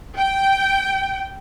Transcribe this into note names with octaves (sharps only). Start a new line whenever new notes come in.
G5